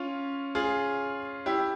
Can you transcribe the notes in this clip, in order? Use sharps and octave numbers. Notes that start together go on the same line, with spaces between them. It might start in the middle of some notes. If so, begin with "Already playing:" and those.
Already playing: C#4 F4
F4 G#4
E4 G4